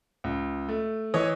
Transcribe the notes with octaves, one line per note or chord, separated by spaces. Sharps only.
C#2
A3
E3 C#5 D#5